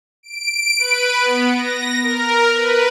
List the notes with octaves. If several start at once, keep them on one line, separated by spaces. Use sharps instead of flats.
D7
B4
B3
A#6
A#4
B4